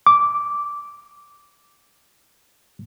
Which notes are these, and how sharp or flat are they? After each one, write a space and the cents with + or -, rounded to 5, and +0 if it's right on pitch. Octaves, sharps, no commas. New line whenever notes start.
D6 -10